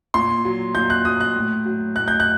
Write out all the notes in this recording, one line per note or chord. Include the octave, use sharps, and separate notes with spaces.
A#2 C6
F#3
A#2 G6
F#6
F#3 D#6
F#6
A2
F#3
A2 F#6
G6
F#6